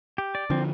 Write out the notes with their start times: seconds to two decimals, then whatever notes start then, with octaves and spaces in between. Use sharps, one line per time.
0.18 G4
0.35 D5
0.50 D3 F3 C4